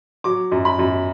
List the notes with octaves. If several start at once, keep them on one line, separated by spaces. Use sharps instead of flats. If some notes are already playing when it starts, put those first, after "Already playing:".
F#3 D6
F#2
B5
F#2